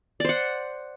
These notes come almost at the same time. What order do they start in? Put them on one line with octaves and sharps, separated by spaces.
D5 C5 F#5